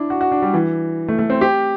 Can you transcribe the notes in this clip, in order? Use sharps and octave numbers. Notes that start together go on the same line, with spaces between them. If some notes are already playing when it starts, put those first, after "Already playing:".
Already playing: D4 E4
F#4
F#4
D4
G3
E3
A3
A3
C4
G4